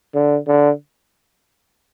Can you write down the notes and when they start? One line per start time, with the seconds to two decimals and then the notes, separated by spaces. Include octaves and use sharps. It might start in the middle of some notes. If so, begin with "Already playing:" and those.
0.15 D3
0.48 D3